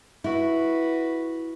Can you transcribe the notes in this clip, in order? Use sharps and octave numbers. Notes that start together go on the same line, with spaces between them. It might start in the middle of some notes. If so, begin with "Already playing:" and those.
E4 F#4 B4